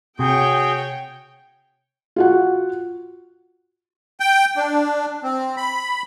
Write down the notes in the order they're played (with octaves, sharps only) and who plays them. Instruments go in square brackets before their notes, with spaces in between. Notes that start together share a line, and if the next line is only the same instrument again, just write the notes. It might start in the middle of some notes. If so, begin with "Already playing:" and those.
[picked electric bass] C3 [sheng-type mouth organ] F#4 G#4 [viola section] C#5 G5
[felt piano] F4 F#4 F#5
[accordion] G5
D4
C4
B5